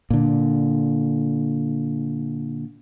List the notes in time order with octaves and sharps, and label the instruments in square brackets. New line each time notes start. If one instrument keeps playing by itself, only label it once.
[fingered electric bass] A#2 D3